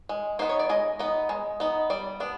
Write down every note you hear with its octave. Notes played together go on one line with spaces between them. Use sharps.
G#3
B3 D#4 C5
C#5
D5
G#3 D#5
B3 D#4
G#3
B3 D#4
G3 D5
B3 D4